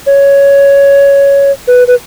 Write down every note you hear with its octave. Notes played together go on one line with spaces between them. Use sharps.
C#5
B4
B4